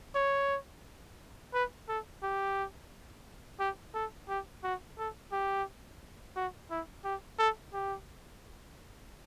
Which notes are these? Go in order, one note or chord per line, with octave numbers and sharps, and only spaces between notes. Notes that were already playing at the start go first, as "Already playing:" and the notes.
C#5
B4
A4
G4
G4
A4
G4
F#4
A4
G4
F#4
E4
G4
A4
G4